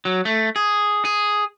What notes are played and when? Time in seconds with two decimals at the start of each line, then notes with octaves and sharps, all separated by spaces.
0.05 F#3
0.25 A3
0.56 G#4
1.05 G#4